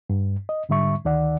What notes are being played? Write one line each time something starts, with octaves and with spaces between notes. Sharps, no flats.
G2
D#5
G#2 D3 G3 E5 C#6
D2 D#3 D5 F#5